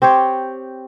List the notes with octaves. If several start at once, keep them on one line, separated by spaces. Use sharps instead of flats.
C4 G4 C5 C#5